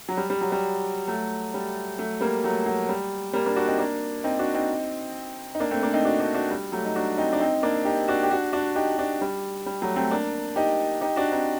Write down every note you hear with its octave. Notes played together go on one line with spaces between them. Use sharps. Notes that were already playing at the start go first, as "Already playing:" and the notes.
F#3
G3
G3
F#3
G3
F#3 A3
G3
F#3 A3
G3 A#3
F#3 A3
F#3
G3
G3 A#3
A#3 D4
D4 F#4
C4 D#4
A#3 D4
C4 D#4
D4 F#4
C4 D#4
D#4
A#3 D4
A3 C4
A#3 D4
C4 D#4
D4 F#4
D4 F#4
D4 F#4
G3
F#3 A3
D#4
D4 F#4
C4 D#4
D4
C4 D#4
A#3 D4
D#4 G4
D4 F#4
G4
D4 F#4
D4 F#4
D#4 G4
D4 F#4
G3
G3
F#3 A3
A3 C4
A#3 D4
D#4 G4
D#4 G4
D4 F#4
C4 D#4